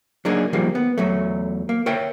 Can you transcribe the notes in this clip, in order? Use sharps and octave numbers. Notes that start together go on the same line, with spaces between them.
F#3 A#3 D4 D#4 G#4
D#3 F3 G3 G#3 A#3
B3
E2 F#3 A3
A#3
A#4 C#5 E5 G5